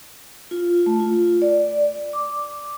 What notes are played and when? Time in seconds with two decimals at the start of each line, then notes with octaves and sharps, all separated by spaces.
0.51 F4
0.86 A3
1.00 F4
1.42 D5
2.13 D6